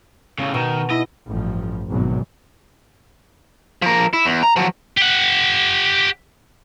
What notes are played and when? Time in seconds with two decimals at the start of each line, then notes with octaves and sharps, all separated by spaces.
0.38 A2 C#3
0.54 B2 D#3
0.90 E4 D#5
1.29 A1 G2 F3
1.91 G#1 E2 B2 F#3
3.82 F3 A#4
4.13 E4
4.25 E2
4.43 A#5
4.56 F3 F#3
4.97 G4 F#5